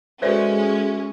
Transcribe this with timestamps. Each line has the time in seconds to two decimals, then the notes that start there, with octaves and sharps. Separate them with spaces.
0.22 G#3 C#4 F#4 A4 B4 C5 D5 E5